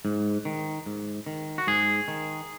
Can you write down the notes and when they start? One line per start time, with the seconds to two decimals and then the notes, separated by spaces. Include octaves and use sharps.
0.05 G#2
0.45 D#3
0.86 G#2
1.27 D#3
1.58 F#4
1.67 G#2 G#4
2.08 D#3